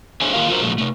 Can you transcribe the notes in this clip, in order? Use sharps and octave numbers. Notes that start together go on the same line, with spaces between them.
D4 G#4 C5 C#5 E5 G#5
D#3 A#3 F4 G4 A#4 F5
F4 F#4 A#4 C5
A#2 F3 F#3 G#3 A3
C3 A3